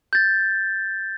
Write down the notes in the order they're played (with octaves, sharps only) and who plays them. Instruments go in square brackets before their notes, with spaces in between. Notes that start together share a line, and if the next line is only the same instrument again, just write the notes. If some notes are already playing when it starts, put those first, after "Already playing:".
[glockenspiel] G6 A6